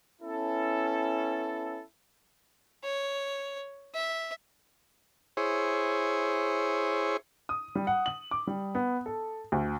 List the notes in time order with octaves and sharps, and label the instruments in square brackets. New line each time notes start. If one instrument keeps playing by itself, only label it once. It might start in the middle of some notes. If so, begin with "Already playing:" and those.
[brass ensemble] B3 C#4 E4 A4
[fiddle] C#5
E5
[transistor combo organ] E4 G#4 C5 C#5
[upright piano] D#6
G3
F#5
F#7
D6
G3
B3
A4
D2